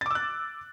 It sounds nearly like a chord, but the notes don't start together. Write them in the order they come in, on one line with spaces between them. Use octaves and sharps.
A6 D6 E6 F#6